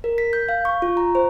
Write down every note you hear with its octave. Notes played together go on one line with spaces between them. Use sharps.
A#4
B6
G6
F5
C#6
F4
A#5
C5